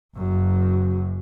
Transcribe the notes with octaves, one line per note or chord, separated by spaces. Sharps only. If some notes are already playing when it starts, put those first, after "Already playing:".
F#1 F#2